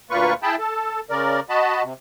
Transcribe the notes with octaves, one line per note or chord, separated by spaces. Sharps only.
D2 A#2 A#3 F4 B4 C#6
E4 G#4 G5 A5 B5
A4
C#3 A#4 D5
F#4 D#5 A5 B5
C3